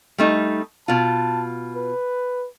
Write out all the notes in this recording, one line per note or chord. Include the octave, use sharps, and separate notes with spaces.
G3 A3 D#4
B2 F4 A5
B4